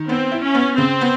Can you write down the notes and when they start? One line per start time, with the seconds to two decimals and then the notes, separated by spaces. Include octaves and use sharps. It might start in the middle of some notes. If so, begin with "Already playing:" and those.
Already playing: D#3
0.09 B3 C4
0.32 E4
0.43 C#4
0.55 B3
0.78 C#3 C4
1.01 B3